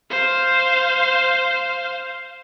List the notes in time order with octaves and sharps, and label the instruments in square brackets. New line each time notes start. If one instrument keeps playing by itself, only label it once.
[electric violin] C5 F5